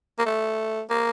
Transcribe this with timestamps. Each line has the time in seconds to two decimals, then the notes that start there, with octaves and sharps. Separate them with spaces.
0.18 A#3
0.26 A3
0.90 A#3